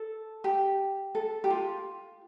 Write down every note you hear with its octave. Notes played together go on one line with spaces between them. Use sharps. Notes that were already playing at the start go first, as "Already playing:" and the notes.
Already playing: A4
G4
A4
G4
F4